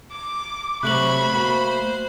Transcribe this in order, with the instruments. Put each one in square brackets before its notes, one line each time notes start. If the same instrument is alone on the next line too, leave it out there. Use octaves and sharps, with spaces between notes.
[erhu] D6
[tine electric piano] C3 A3 [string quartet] F#3 C5 C#6 [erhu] B5 [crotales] F#6 F#7
[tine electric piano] A3 A#3 F#4 [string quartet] C5